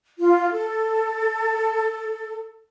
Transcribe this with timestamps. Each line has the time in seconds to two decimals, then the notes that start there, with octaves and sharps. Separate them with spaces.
0.19 F4
0.52 A4